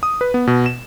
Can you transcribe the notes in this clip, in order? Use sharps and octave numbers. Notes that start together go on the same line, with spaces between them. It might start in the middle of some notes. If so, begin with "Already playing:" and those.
D#6
B4
B3
B2
E7